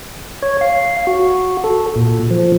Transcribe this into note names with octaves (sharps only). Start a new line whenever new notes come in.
C#5
F5
F#4
A4
A#2
F3